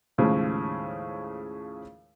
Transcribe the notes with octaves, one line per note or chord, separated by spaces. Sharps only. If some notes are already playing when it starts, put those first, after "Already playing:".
D#2 A2 C#3 F3 G#3